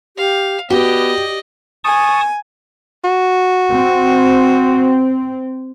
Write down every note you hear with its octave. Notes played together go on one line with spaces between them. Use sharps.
G4 F5
B3 F#4 G4 D5 D#5
G#5 A5 C#6 D#6
F#4
C4